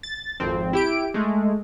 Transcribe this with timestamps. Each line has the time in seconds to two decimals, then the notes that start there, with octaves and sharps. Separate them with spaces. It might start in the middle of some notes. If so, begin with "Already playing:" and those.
0.03 A6
0.40 G#1 F2 C4
0.73 E4 G4 D7
1.14 G#3 A3